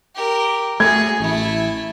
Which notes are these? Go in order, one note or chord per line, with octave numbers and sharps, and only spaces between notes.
G4 A#4
A3 F#4 G#4 G#6
A1 A3 E4